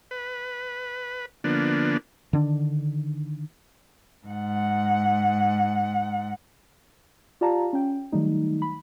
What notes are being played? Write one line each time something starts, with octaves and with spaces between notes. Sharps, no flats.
B4
D3 F3 A#3 B3 D4
D3 D#3 D4
G#2 F#5
F4 G4 D5 F5 A5 A#5
C#4 G5
D#3 F#3 G3 A3 D#4
B5